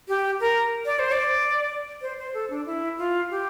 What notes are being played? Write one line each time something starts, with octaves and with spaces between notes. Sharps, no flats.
G4
A#4
D5
C5
D5
C5
C5
A4
D4
E4
F4
G4